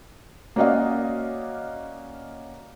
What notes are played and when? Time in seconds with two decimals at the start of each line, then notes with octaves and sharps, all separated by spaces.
0.56 A#3 C#4 F#4 D5 D#5 F5